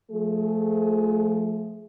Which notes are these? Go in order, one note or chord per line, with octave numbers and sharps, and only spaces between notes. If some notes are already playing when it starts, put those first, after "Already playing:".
F3 A3 G#4